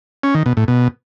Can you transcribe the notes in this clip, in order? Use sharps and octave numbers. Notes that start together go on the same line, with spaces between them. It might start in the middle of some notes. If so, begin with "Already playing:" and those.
C#4
D#3
B2
A2
B2